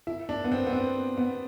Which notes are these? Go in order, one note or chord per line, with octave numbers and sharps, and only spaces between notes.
E4
D4
B3
C4
B3
C4
B3